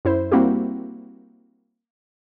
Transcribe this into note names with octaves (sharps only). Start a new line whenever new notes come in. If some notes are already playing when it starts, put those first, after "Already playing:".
F#2 E4 C5
G3 A#3 C4 E4 F#4 G4